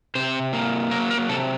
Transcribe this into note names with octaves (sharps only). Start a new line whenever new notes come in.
C3 C5
A#3
F#3 A#4
A#4
C3 A4